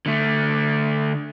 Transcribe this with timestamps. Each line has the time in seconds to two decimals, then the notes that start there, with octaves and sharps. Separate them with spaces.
0.06 D3 A3